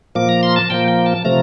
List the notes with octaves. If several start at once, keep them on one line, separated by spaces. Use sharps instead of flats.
A#2 F3 A#3 D6
A#5
C6
A5
A#2 F3 A#3 G5
G5
A5
C3 F3 A3 A#5